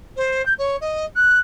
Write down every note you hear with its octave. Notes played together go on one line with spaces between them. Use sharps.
C5
G6
C#5
D#5
F#6